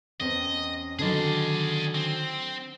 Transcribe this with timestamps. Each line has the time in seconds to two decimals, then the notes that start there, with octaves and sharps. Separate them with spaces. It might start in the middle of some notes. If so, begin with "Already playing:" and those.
0.20 E2 C4 C#4 D#5
0.99 D3 D#3 F#3 G#4 D5
1.95 C4